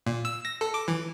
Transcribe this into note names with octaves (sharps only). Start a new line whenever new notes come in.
A#2
E6
A#6
A4
D6
E3